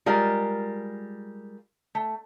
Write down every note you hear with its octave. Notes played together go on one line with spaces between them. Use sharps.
G3 G#3 F4 A#4 F5
A3